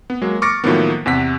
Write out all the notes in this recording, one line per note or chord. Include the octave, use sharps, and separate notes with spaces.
B3
F#3 G#3 A#3
C#6 D6 F6 A6 A#6 C#7
A2 D#3 F3 F#3 A#3 B3
E2 C3 F#5 B6